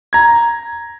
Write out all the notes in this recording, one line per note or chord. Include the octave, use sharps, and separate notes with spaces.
A#5 G#6